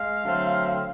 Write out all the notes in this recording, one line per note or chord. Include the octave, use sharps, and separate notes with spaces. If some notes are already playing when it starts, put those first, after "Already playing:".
Already playing: G#3 F5
D3 F#3 A3 C4